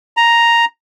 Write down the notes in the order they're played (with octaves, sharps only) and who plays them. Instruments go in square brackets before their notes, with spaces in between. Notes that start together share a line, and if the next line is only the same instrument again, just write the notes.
[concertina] A#5